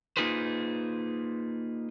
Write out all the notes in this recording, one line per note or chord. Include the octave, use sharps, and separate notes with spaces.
A#3 D#4 F4 G#4 B4 C5